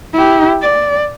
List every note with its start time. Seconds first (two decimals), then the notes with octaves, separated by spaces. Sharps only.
0.13 E4 G4
0.62 D5